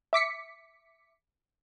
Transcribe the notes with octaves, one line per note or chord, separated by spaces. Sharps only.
E5 D6 B6 C#7